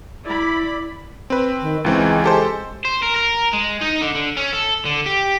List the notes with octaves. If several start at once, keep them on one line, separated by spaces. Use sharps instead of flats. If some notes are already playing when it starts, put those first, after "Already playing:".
E4 D5 B5
C4 B4
D#3
C#2 E3 G#3 C4
G4 A4 C5
C5
A#4
A#4
G#3
D#4
D3
D3
C#4
A4
D3
G4